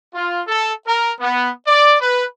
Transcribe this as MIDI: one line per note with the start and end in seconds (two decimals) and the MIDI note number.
0.14 0.41 65
0.47 0.71 69
0.87 1.11 70
1.20 1.49 59
1.67 1.96 74
2.01 2.24 71